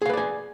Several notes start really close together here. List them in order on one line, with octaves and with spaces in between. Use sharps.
G#4 F5 B4 D5 G#5